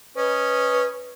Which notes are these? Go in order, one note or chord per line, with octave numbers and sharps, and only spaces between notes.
C#4 B4 D#5